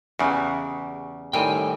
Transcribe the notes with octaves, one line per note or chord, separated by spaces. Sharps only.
E2 C#3 F#4 G4
A2 D#3 G3 C4 G5 G#5